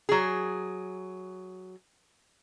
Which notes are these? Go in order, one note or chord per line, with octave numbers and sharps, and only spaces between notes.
F#3 G#4